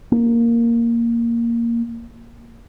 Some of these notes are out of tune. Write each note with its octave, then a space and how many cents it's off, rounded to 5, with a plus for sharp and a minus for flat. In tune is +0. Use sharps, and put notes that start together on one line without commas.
A#3 +0